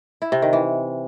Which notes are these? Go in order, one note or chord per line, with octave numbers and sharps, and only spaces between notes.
E4
C3
D#3
E3